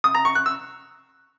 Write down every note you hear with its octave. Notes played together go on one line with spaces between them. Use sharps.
D#6
A#5
C#6
F#6
E6